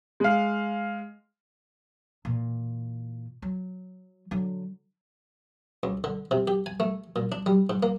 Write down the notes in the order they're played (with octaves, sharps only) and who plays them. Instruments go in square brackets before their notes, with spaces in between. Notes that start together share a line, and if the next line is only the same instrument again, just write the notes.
[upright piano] G#3 F5
[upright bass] A#2 E3
F#3
D3 F#3
[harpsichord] C#2
D3
C3
G4
G#5
A3
A#2
D4
G3
G#2
A#3